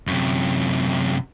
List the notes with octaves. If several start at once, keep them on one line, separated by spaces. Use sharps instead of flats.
F#2 C3